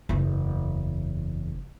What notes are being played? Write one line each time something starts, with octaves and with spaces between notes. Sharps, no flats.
F#1 E2